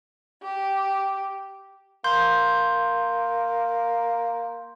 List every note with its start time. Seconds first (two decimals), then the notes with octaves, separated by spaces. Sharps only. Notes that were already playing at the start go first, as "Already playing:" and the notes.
0.44 G4
2.04 A#3 C6 G6